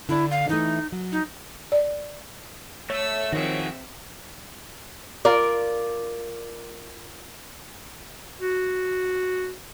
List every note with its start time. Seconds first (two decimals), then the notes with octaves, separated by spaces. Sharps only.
0.09 D3 D4 E4
0.31 F5
0.49 E3 A3 D#4
0.92 F#3
1.12 D#4
1.72 D5
2.90 A3 C#5 A5 E6
3.32 D#3 F3 C4 F#4 G#4 E5
5.25 F4 A#4 D5
8.41 F#4